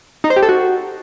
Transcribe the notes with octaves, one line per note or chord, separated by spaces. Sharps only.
D#4
C5
G4
A4
F#4